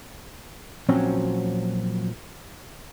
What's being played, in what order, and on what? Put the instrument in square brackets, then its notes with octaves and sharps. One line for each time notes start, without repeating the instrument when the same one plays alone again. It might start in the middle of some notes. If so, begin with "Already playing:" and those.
[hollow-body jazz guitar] A#2 F3 F#3 C4 C#4 F#4